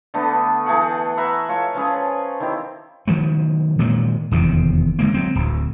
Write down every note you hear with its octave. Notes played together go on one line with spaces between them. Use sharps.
D3 A3 B3
E3 A3 G#4 F#5
B4 E5 F#5 A#5
F4 A4 C#5 F5
F3 C#4 G#4 B4
D#3 C4 E4 G4
D#3 F3 F#3 A3
A#2 D#3 F#3 G#3
F1 E2 C3 D#3
D3 G#3 A#3
F#3 C4
D1 D2